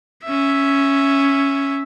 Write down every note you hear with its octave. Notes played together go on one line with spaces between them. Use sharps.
C#4 E5